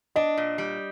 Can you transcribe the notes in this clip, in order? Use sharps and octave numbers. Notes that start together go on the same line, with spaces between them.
D4 D#5
A#2
G3